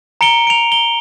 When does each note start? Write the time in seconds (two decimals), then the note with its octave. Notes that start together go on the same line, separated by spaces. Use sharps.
0.21 A#5 C#7 D7 G7
0.47 D7 F7
0.72 G7